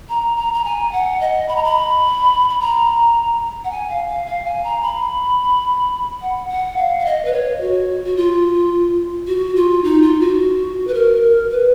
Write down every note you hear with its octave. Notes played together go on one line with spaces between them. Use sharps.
A#5
A#5
A#5
G#5
F#5
D#5
B5
A#5
B5
B5
A#5
F#5
G#5
F5
F5
F5
G#5
A#5
B5
F#5
F#5
F5
F5
D#5
B4
C#5
F#4
F#4
F4
F#4
F4
D#4
F4
F#4
B4
A#4
B4